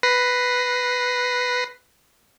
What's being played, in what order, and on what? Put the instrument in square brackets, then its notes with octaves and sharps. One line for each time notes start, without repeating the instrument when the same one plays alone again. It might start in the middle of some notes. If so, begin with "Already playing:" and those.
[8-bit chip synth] B4 A#6 C7